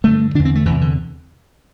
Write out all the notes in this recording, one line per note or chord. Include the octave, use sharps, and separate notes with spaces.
G2 D3 A3
E2 D3 D4
C4
A3
E2 C3 E3
D3